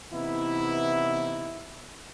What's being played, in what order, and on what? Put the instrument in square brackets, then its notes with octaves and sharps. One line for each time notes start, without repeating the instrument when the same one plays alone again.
[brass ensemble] C3 E3 B3 D#4 E4